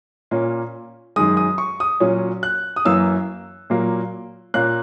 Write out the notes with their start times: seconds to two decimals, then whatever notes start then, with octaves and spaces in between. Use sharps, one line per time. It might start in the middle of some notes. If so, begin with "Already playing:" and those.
0.31 A#2 A#3 C#4
1.16 F#2 D#3 G#3 D#6
1.37 D#6
1.58 C#6
1.80 D#6
2.00 A#2 F#3 C#4
2.43 F#6
2.76 D#6
2.85 F#2 E3 A#3 C#4 E6
3.70 A#2 F#3 A#3
4.54 A#2 A#3 C#4 F#6